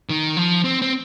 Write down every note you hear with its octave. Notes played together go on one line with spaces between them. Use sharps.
D#3
F3
C4
C4